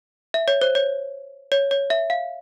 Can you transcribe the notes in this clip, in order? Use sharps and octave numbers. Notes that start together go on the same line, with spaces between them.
E5
C#5
C5
C#5
C#5
C#5
E5
F5